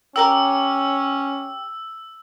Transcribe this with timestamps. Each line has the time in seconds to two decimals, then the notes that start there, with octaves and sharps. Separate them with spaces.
0.16 C#4 G4 A#4 D6 E6